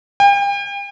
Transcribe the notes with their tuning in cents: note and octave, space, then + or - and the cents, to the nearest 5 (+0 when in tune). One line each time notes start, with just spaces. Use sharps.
G5 +40